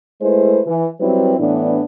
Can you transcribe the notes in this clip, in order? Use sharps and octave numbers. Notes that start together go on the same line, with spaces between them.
G#3 A3 E4 B4 C5
E3
F#3 G3 C4 E4 B4
A2 E3 B3 D4